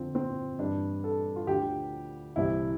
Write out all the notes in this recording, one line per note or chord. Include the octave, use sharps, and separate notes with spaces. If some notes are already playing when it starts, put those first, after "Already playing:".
Already playing: F2 D3 F3 C4
C4
G2 E3 D4
A4
F4
D2 D3 F3 G4
C2 C3 E3 E4